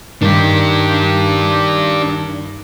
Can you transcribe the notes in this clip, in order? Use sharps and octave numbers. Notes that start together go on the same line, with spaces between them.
G2 D#3 D4 G4